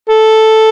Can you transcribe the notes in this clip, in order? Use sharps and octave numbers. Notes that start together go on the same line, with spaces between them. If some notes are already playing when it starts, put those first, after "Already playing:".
A4